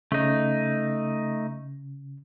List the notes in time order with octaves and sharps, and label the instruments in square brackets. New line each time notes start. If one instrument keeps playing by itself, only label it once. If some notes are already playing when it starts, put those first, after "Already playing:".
[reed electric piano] C#3 [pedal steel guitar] A3 D#4